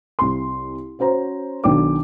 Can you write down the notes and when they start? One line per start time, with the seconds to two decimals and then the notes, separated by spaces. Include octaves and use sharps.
0.19 C2 C6
0.99 C#4 F#4 C5 A#5
1.64 B1 D#3 D4 G5 D6